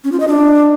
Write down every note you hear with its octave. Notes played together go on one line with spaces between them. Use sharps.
C#4
F4
D#5
D4